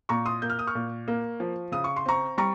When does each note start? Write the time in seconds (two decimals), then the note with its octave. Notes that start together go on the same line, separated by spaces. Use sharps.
0.09 A#2 A#5 C#6
0.26 C6 D#6
0.42 A#3 G6
0.50 F6
0.59 D#6
0.67 C#6 F6
0.75 A#2
1.08 A#3
1.40 F3
1.72 C#3 D#6
1.84 C#6
1.96 C6
2.06 C4 A#5 C#6
2.38 G3 A#5 C#6